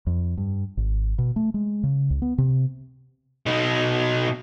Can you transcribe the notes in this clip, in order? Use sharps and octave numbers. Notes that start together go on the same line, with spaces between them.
F2
G2
G#1
B2
A3
G#3
C#3
C#2
B3
C3
B2 D#4